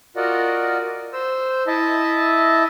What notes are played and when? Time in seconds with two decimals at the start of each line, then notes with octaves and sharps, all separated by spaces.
0.16 F4 F#4 A#4 D5 D#5 F#5
1.13 C5 E6
1.67 E4 D#5 E5 A5